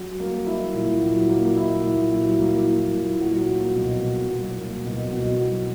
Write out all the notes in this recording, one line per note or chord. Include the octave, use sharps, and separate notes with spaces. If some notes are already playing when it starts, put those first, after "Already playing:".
Already playing: F#3
A#3
E4
A#2
F#3
A#3
E4
A#2
F#3
A#3
E4
A#2
F#3
A#3
B2
B2
F#3
A#3
B2
B2
F#3